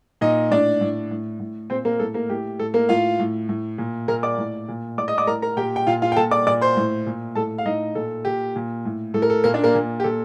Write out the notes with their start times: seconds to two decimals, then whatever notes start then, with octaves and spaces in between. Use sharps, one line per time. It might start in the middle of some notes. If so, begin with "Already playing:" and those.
0.21 A#2 D#4 D#5
0.51 A2 D4 D5
0.81 A2
1.11 A2
1.40 A2
1.70 A#2 C4 C5
1.85 A#3 A#4
2.00 A2 A4
2.14 A#3 A#4
2.30 A2 G4
2.60 A2 A4
2.74 A#3 A#4
2.89 A2 F4 F5
3.20 A2
3.49 A2
3.78 A#2
4.08 A#2 A#4 A#5
4.23 D5 D6
4.38 A2
4.68 A#2
4.97 A2 D5 D6
5.08 D#5 D#6
5.18 D5 D6
5.27 A2 A#4 A#5
5.42 A#4 A#5
5.57 A#2 G4 G5
5.76 G5
5.87 A#2 F4 F5
6.02 F4 F5
6.12 G5
6.16 A#2 A4 A5
6.31 D5 D6
6.46 A#2 D5 D6
6.61 C5 C6
6.77 A2
7.06 A#2
7.35 A2 A4 A5
7.58 F5
7.66 A2 D#4 D#5
7.95 A#2 A4
8.25 A#2 G4
8.56 A#2
8.85 A2
9.14 A2 A4
9.22 A#4
9.30 A4
9.44 A#2 A#3 A#4
9.54 D4 D5
9.64 A#3 A#4
9.75 A#2
10.00 G4
10.04 A#2 A4